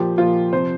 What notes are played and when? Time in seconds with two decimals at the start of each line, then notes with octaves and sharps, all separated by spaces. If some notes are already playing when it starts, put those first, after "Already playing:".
Already playing: A#2 F3 G4
0.17 A#2 F3 F4
0.52 C3 F3 C5